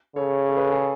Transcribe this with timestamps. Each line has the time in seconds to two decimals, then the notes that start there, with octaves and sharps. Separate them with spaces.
0.16 C#3 A4 C#5
0.49 A4 C#5
0.57 G#4 B4
0.65 A4
0.72 G#4